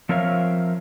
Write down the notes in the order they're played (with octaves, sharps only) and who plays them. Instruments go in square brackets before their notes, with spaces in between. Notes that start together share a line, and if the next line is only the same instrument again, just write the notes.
[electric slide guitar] F3 C4 A#4 C#5 E5 F5